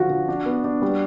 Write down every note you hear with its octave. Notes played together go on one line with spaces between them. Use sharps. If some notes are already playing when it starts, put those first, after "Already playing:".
Already playing: D3 F3 F4 F#4
F3
D4
B3
D4
G3